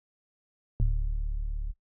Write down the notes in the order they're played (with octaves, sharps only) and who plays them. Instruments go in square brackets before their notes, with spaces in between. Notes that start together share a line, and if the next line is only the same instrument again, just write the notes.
[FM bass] D1